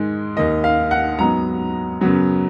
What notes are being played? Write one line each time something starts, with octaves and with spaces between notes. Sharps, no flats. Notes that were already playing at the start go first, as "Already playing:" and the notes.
Already playing: G#2 D#3 G#3
D#2 D#3 A#3 D#4 D#5
F5
F#5
G#2 F#3 B3 D#4 A#5
F#2 C#3 F#3 B3